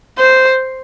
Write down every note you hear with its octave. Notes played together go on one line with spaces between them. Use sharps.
C5